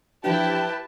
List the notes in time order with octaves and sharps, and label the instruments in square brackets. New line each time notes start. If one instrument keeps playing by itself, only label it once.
[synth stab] E3 F3 D4 [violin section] E4 A5 [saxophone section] G4 [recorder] B4